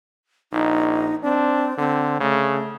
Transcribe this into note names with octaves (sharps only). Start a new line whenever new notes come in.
A#1 D#4
C4 D4
D3 C4
C#3 A3